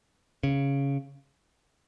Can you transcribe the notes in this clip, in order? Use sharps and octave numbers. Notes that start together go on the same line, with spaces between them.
C#3